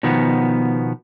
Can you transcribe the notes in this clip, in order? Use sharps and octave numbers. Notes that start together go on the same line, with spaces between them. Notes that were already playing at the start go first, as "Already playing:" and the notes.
B2 D#3 F3 B3